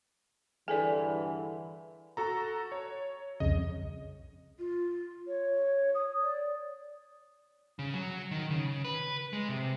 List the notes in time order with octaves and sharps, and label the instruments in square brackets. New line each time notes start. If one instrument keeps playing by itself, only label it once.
[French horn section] G2 D3 E3 [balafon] G#4 A4 D5 [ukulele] G#5
[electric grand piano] F#4 A4 A#5
C#5
[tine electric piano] C2 F2 C#3 [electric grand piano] D#5
[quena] F4
C#5
D#6
D5
[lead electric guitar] C#3
F#3
D#3
C#3
B4
G#3
C3